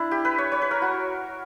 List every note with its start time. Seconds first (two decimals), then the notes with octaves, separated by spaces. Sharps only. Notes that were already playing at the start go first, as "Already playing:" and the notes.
Already playing: D4 E4
0.11 G4
0.25 B4
0.38 C#5
0.52 C#5
0.62 B4
0.71 A#4
0.82 F#4